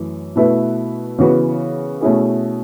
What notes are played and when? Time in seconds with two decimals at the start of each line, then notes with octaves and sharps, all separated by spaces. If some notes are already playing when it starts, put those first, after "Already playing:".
Already playing: F#2 E3 A3
0.36 B2 A3 E4 B4
1.18 C#3 E3 B3 F#4
2.01 B2 A3 C#4 E4 G#4